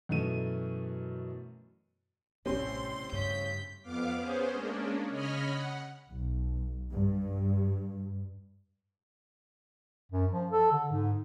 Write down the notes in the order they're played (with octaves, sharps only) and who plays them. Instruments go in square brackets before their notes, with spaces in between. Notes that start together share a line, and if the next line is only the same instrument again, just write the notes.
[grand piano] F#2 B2 E3 A3 B3 D#7
[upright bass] A1 C3 [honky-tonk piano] A2 G3 C4 [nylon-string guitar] C#4 [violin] C6
[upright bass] G2 [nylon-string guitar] C#3 [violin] G6 B6
[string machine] F2 B3 F5 D6
B3 C#4 G#4 C5
G#3 A#3 C#4 D4
C#3 C#5 D#5 B5 F6
F#5
[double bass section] B1
G2
[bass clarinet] F#2
F3
A4
D3
G#2